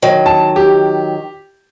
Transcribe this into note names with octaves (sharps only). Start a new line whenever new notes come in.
D#3 F#3
A5
G4